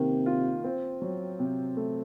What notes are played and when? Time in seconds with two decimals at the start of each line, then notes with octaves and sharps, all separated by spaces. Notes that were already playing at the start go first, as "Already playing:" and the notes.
Already playing: C3 D#3 A#3
0.26 F4
0.64 C4
1.02 F#3
1.39 C3
1.77 A3